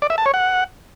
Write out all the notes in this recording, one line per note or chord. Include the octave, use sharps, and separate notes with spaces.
D5
E5
A5
C#5
F#5